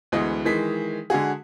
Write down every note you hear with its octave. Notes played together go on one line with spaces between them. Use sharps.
D2 E3 G#3 B3 D#5
D#3 E3 G#3 B6
D3 G#3 F#4 G#4